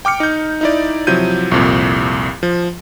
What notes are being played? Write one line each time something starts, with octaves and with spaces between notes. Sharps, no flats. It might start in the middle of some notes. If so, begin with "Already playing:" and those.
G5 D6 F6 C#7
D#4 G6
D#4 E4 D5
C3 F3 F#3 E4 G6 D#7
C2 F2 A#2
F3